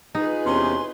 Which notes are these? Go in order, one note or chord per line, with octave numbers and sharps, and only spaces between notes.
D#4 F4 G#4 B4
E2 C3 C#4 C6